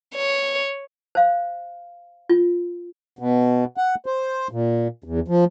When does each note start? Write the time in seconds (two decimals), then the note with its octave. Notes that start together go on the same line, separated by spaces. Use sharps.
0.16 C#5
1.15 C5 F5
2.29 F4
3.19 B2
3.77 F#5
4.06 C5
4.52 A#2
5.04 E2
5.28 F3